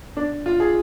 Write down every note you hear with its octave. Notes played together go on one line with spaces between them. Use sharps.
D4
F4
G#4